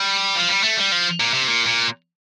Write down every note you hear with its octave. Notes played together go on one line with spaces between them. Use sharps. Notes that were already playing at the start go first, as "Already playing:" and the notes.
Already playing: G3
F3
G3
A3
G3
F3
A#2
C3
A#2
A#2